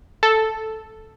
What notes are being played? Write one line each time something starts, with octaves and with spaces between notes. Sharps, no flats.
A4